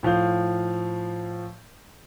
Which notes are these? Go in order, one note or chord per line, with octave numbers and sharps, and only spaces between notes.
A2 F3 F5 G6